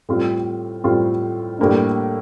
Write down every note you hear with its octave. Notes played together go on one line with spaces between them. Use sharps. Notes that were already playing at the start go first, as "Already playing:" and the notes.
A2 G3 C4 F4
A2 G3 C4 F4
A2 G3 A#3 D4